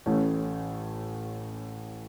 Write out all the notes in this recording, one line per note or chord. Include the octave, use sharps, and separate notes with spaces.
A1 A2 A3 C#4